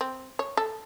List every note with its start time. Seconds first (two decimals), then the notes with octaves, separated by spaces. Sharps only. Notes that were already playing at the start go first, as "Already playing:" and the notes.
0.01 C4
0.39 C#5
0.57 A4